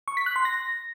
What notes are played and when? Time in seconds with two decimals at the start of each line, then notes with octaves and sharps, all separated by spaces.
0.08 C#6
0.17 B6
0.26 F#6
0.36 C6
0.45 A#6